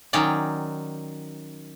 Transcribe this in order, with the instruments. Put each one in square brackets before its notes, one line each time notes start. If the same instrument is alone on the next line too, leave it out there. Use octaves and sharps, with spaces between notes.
[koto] D#3 F#3 C#4 D5 G5